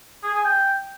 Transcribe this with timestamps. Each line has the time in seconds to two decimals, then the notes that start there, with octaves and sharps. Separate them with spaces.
0.24 G#4
0.34 G#5
0.44 G5